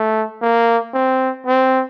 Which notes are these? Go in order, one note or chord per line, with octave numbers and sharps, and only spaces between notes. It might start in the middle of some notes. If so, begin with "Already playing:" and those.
Already playing: A3
A#3
C4
C4